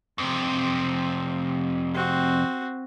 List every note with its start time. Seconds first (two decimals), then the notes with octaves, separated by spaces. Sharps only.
0.18 F2 C3 C4
1.94 C4 F#4